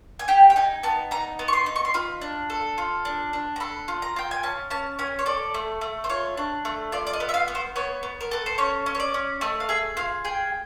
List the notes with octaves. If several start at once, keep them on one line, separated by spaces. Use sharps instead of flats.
G#5
G4 G5
G5
D#4 G#5
B3 A5
D#4 A#5
B3
C#6
C6
D#4
C#6
C6
F4 B5
D4
A4
F4
D4
D4
A#5
A4 B5
F4
A#5
F4 G5
G#5
C#4 A5
C#4 A5
C#4 G#5
C#5
A4 D5
A3
A3
C5
F4 C#5
D4
A3
F4 D5
D5
D#5
B3
E5
F5
B3
C5
B3 C#5
B3
A#4
A4 B4
C5
C#4 C#5
C#4
C#5
D5
C#4
A3 D#5
F5
G#4 E5
F4 F5
G#4 G5